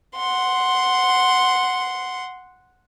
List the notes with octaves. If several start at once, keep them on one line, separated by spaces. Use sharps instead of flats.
F#5 C6